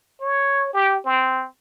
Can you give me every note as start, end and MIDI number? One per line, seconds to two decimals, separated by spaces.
0.21 0.71 73
0.73 0.98 67
1.05 1.45 60